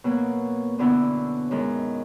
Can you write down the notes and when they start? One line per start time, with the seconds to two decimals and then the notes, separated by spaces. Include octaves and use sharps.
0.04 B2 F#3 A#3
0.79 F#2 D3 F#3 B3 E4
1.51 F#2 D#3 G#3